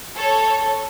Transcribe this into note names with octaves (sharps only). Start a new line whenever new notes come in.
A4 C#5